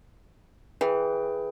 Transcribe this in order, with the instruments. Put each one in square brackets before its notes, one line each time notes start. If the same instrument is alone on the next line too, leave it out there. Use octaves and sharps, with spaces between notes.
[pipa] E3 [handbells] G#4 B4 G5